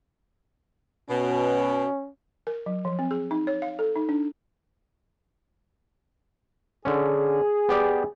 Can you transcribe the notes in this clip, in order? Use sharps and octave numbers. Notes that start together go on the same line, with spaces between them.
B2 C#4
A#4
F#3
F3
C4
G#4
D#4
C#5
F5
A4
D#4
D4
D3 C#4 G#4
B3 G4 D5